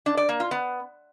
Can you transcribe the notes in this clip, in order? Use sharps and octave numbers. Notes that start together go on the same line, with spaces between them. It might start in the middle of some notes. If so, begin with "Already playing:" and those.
D4
D5
A#3
F4
B3